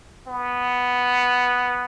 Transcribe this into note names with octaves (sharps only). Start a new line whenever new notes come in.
B3